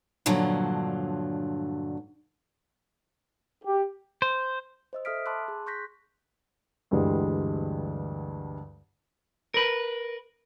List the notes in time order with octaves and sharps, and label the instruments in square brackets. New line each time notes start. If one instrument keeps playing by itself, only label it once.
[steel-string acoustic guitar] G2 A#2 D3 F3 F#3
[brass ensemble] G4
[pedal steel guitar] C5
[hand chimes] C5 D#5 E6
A4 E5 D#6 F6 B6 D7
A5 B5 C6 D6 E6 F#6
G#4
C6 C#6 F#6 G6 A#6 B6
[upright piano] D2 G2 D3 E3 G3 G#3
[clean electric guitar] A#4 B4